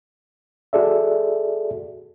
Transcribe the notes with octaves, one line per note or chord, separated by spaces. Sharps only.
F#4 G#4 A4 D5 E5